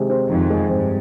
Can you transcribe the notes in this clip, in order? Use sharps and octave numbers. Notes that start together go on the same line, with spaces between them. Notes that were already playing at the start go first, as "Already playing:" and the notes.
Already playing: C3 D#3 G#3
C4
F2 D#3
G#3
G2 C4